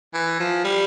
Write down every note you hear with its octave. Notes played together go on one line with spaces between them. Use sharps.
E3
F3
G3